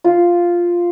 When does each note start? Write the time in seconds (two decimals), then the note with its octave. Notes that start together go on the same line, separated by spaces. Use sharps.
0.04 F4